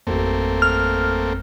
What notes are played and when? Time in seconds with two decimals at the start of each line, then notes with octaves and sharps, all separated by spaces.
0.07 G#1 F2 A3 A#3 C4
0.62 F6